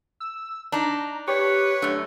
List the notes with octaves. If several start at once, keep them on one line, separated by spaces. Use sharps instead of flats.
E6
D4 D#4 A#5
G4 B4 C#5
F#2 A3 D4